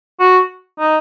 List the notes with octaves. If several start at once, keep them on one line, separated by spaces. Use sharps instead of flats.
F#4
D#4